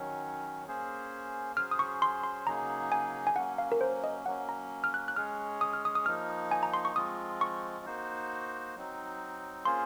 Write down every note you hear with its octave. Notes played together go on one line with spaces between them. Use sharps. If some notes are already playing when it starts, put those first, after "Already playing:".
Already playing: D#3 F#3 C#4
A#3 C#4 G#4 C5
F#3 C#4 G#4 C5 F6
D#6
C#6
C6
C6
C#3 F#3 A#3 D#4 G#4 A#5
G#5
G#5
F#3 A#3 C#4 F#5
F5
A#4
C5
D#5
F#3 A#3 C#4 F#5
A#5
F6
F#6
F#6
G#3 C#4 G#4 C#5 F6
D#6
F6
D#6
D#6
F3 A#3 D#4 F6
G#5
A#5
C6
C#6
F3 G#3 C4 F4 D#6
C#6
A#3 D#4 F#4 C5
F#3 C4 D#4
A#3 C#4 F4 G#4 C5 C6